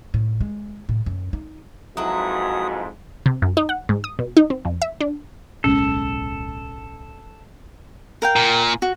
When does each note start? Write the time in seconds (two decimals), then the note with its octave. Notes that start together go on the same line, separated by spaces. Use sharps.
0.14 A2
0.41 G#3
0.89 A2
1.06 F#2
1.33 D#4
1.97 F2 G#2 F#3 E4 F#4 B4 D#6
3.26 C3
3.42 F#2
3.57 D#4
3.69 F#5
3.89 G#2
4.04 D#6
4.19 B2
4.37 D#4
4.50 C4
4.65 F2
4.82 E5
5.01 D4
5.64 D1 B1 G#3 C#4 A4
8.22 A#4 F5 G5
8.36 A#2
8.82 F#4